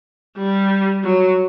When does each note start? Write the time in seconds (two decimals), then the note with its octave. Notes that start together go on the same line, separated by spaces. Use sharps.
0.37 G3
1.04 F#3